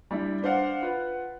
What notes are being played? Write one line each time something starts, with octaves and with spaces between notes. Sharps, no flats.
G3 D4 E4
D4 C5 D5 F5 F#5
F4 B4 F#5